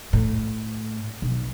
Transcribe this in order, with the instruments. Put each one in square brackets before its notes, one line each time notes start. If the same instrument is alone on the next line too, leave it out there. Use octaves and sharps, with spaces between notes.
[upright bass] A2
B1